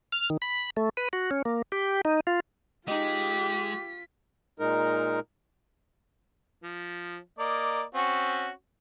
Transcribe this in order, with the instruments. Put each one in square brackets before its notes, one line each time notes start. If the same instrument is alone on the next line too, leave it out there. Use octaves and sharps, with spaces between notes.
[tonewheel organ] F6
D#3
B5
A3
B4
F#4
C#4
A#3
G4
D#4
F4
[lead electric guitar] G#3 [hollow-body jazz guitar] D#4 D#5 [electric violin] F4 B6 [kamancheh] G4
[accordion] A#2 G#3 D#4 A#4
[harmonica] F3
A#3 D5 D#5
C4 C#4 F#4